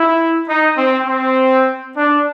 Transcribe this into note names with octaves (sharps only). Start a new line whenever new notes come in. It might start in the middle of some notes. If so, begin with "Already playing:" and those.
Already playing: E4
D#4
C4
C4
D4